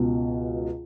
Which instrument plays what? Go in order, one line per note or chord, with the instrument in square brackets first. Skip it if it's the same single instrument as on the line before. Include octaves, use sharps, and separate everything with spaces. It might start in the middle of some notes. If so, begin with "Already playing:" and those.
Already playing: [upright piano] C#2 B2